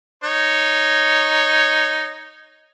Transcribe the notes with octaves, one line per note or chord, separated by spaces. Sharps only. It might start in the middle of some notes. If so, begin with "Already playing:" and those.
D#4 C#5